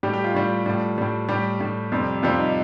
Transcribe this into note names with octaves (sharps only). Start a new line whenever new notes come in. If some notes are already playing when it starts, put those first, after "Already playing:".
A2 G3 G4
G4
F4
A2 G3
A2 G3
A2 G3
A2 G3 G4
A2 G3
F2 C3 G3
F2 C3 G3 F4
D#4